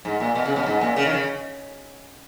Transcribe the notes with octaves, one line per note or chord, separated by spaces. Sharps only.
G#2
A#2
B2
C#3
B2
G#2
A#2
C#3
D#3
C#3